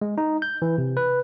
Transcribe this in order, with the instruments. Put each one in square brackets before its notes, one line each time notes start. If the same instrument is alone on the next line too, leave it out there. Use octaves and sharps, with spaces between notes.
[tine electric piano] G#3
D#4
G6
E3
C3
B4